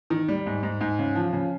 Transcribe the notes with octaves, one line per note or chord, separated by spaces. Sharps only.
D#3
G3
G#2
G#2
G#2
C#3
F3
C#3